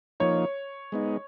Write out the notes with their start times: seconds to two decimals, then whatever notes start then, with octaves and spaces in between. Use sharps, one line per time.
0.20 F3 A#3 D#4 C#5
0.92 G#3 B3 D#4